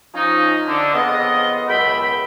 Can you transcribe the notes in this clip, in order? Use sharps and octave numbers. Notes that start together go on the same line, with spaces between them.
F3 C#4 D#4
D3
F2 C#3 B3 F4 D#5
C#2 F#2 B2 E5 G5 B5